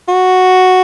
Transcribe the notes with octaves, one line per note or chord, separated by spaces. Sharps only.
F#4